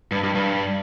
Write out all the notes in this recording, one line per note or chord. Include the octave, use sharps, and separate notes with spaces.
G2
G2
G2